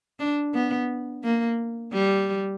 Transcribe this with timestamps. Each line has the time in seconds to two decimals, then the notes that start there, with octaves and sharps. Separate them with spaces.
0.20 D4
0.54 B3
1.24 A#3
1.93 G3